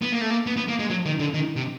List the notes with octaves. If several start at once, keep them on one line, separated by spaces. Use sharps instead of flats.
B3
A#3
A3
A#3
B3
B3
A#3
G#3
F#3
D#3
D3
D#3
C3